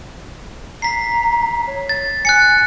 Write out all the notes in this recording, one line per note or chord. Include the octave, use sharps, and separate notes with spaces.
A#5 B6 C7
C#5
A6
G#5 F#6 A6 C#7